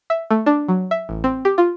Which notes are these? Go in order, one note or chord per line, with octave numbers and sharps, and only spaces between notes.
E5
A3
D4
F#3
E5
A1
C4
G4
F4